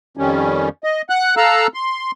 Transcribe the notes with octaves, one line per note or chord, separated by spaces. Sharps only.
F2 D#3 G3 C#4
D#5
F#5 F#6
A4 F5 A#5 E6 F#6
C6